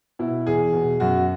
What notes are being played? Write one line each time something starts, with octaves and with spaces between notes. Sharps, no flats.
B2 E4
E2 G#4
B2
F#2 F#4